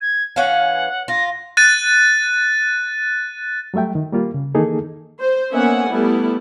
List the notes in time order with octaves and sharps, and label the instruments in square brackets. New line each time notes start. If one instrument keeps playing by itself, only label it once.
[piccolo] G#6
[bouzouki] E3 C#4 F5 [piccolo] F#5
[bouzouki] F4 [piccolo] A#6
[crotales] F#6 A6 D#7
[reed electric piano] F#3 G3 A3 E5 G5
D#3
G3 A#3 F4
C#3
D#3 E3 A#3 D#4 G#4 A4
[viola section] C5
A#3 B3 C#4 E5 F#5 G#5
G3 A3 B3 E4